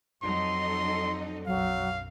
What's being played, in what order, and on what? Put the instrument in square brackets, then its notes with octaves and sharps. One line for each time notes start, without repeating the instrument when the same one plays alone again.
[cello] F2 F#3 [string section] D#4 A4 D#5 [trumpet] C6
[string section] B1 F#2 [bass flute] F#3 [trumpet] F5